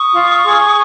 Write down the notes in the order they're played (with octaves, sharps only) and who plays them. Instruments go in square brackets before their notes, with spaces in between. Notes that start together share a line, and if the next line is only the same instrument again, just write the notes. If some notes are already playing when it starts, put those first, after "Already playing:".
Already playing: [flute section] C#6 D#6
F4
G#4